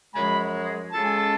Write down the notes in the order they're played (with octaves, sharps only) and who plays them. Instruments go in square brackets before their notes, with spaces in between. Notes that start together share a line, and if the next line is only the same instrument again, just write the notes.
[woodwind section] F#2 F3 G#3 [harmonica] G#5 B5
[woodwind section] C#3 G#3 C#4 F4 A4 [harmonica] A5
[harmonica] G#5
A5